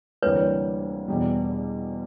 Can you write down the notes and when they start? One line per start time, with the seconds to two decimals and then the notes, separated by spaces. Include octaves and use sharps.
0.23 D2 C3 E3 G3 A#3 B4 C#5
1.08 E2 B2 G3